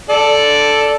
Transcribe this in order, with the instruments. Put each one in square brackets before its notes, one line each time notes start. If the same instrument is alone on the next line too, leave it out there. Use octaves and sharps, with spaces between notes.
[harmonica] A4 D5